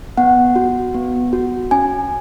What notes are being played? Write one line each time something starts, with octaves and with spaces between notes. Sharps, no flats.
B3 F#5
F#4
B3
F#4
C#4 G#5